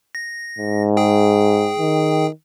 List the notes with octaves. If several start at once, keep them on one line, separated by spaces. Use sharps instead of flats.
A#6
G#2
G#4 G5
D#3